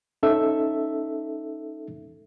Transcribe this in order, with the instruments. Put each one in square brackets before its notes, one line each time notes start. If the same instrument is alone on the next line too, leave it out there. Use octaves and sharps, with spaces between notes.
[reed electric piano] C#4 D#4 A4 E5